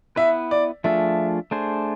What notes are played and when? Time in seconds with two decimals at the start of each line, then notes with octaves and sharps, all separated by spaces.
0.16 B3 E4 B4 E5
0.51 D5
0.84 F3 A3 D4 F4 G#4 E5
1.51 A3 D4 G#4 C5